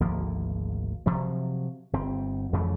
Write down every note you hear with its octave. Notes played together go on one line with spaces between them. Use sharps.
G#1 D2 F3 A#3
C3 F3 F#3
G1 C4
F2 C#3 E3 A3